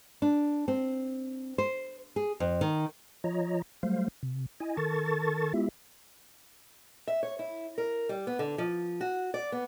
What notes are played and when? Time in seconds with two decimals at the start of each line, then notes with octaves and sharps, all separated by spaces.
0.22 D4
0.68 C4
1.58 C5
2.16 G#4
2.40 F2
2.61 D#3
3.24 F3 F4 C#5 D#5 A#5
3.83 F#3 G3 A3 C5 F5
4.23 C3
4.60 E4 D#5 G#5
4.77 D#3 A4 A#4 A5 C#6 A6
5.54 G#3 B3 E4 F4 G4 E5
7.07 E5
7.23 C#5
7.39 E4
7.78 A#4
8.09 G3
8.27 B3
8.39 D3
8.58 F3
9.01 F#4
9.34 D5
9.52 B3